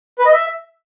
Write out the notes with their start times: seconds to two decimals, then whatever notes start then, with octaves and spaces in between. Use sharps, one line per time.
0.19 B4
0.26 D#5
0.33 E5